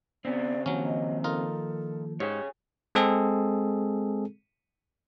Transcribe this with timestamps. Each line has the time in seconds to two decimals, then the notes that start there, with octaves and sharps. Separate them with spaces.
0.25 C#3 B3 C4 D5
0.66 D#3 F3 F#3 A#3 C#4
0.85 D#5
1.24 D#4 F4 A4 A#4
2.20 G#2 G4 G#4 C#5 F#5 G5
2.95 G#3 C4 G#4 A4